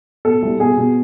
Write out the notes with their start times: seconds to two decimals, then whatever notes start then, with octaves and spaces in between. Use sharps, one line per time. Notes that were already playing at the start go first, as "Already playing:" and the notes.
0.25 B2 A4
0.43 C2
0.60 B2 G#4
0.77 B2